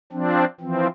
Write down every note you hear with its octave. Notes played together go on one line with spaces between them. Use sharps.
F3 C4 D4
E3 F3 C4